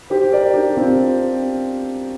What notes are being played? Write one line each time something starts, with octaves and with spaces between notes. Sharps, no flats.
G4 C5
A#4 D5
D4 G4
C4 F4